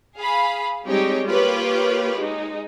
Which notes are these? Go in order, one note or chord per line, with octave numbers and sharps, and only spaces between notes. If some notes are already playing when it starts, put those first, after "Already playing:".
G#4 F5 B5
G3 G#3 C4 D#4 G4 C#5
A#3 F4 G4 B4 C#5
G#3 D#4